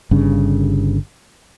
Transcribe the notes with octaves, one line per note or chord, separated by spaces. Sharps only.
G1 G2 C#3